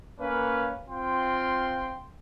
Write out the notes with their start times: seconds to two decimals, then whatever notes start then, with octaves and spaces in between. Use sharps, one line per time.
0.19 A#3 C#4 B4 F5
0.88 C4 F4 G5 C6